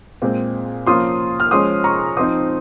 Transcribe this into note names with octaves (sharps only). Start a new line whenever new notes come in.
A#2 G#3 C4
F3 A#3 C#4 F4 C6 D#6
F6
F3 G#3 C#4 C6 D#6
A#5 C#6
F3 C4 D#4 C6 D#6